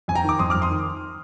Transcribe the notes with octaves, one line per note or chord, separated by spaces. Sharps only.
F2 G#5
G5 A#5
D#3 D6
F2 C6 D#6
F2 D6 F6
C6 D#6
D#3